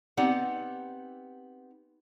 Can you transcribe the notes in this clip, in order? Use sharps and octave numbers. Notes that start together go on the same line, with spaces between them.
B3 C4 D#4 G4 D5 F#5